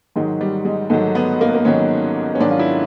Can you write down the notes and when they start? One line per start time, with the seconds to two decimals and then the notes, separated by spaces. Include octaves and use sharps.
0.16 G#2 D#3 F#3 G#3
0.41 G3
0.65 G#3
0.90 G#2 D#3 F#3 A3
1.15 B3
1.41 A#3
1.48 B3
1.55 A#3
1.65 G#2 D#3 F#3 C#4
2.35 C#4
2.40 G#2 D#3 F#3 D4
2.51 F4
2.59 E4